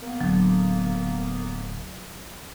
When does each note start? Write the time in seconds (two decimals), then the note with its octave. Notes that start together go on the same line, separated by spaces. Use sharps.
0.02 A#3 B3
0.21 D1 D2 D3 F#3